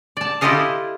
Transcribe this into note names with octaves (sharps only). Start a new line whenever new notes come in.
D5 A5
E4 F4 G4 A4 D#5 F5